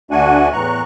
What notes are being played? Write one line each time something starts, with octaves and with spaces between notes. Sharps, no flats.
D2 A3 D4 F#4 F#5 G#5
E2 A2 E3 A#5 C#6 F#6